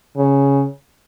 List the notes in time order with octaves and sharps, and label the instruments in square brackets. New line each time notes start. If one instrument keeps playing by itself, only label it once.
[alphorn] C#3